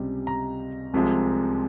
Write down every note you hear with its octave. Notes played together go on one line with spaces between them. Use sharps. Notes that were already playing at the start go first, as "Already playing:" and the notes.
Already playing: C#2 C3 G3
A#5
C2 C3 F3 G#3